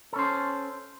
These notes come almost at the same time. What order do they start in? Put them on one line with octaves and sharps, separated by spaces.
A4 C#4 C5